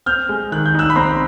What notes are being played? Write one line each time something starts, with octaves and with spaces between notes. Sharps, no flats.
C4 F6 G6
G#3
D#3 F#6
G6
D#4 E6 F#6
B5
C4 A#5 C6